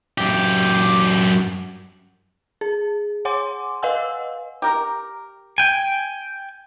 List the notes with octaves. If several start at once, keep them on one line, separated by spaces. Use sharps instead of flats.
F#2 G4
G#4
C#5 F#5 G#5 C6 D6
B4 D#5 F5 F#5 G#5 E6
G4 A#4
G5 G#5